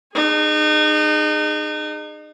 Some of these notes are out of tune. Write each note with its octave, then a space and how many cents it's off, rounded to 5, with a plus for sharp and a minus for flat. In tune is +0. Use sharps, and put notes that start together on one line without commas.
D#4 -35 G#4 -5